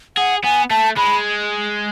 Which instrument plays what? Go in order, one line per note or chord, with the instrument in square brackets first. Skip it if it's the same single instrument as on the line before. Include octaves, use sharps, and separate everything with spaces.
[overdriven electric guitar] G#4 [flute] F#5
[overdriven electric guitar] B3 [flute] G#5
[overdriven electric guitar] A3 [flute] A5
[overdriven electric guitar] G#3 [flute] B5